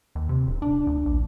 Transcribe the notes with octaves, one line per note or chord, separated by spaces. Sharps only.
D#2
C3
D1
D4
D2
A#1